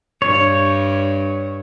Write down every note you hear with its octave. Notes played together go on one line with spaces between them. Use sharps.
G2 C#5